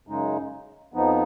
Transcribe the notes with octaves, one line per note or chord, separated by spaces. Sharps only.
F#2 C#3 G#3 D#4
F2 F3 B3 D#4